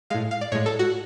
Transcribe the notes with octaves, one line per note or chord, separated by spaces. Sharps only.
A2 G#3 F5
F5
D5
A2 G#3 C#5
A4
F#4